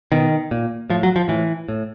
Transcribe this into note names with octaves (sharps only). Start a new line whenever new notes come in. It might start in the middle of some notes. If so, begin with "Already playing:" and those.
B2 D#3
A#2
A2 F3
F#3
F3
A2 E3
A2